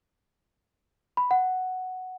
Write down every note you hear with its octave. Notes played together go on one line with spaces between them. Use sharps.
B5
F#5